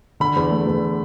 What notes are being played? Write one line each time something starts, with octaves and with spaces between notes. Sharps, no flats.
D3 B5
E2
A3
E2